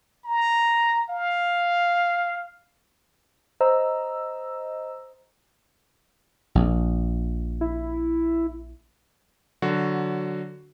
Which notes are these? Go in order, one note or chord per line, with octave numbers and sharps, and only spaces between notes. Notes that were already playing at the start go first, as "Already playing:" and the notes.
A#5
F5
C5 D#5 A#5 E6
A#1
E4
D3 F#3 F#4